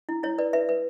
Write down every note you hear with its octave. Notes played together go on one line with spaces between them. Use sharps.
E4
E4 C#5
B4 D5
B4 E5
B4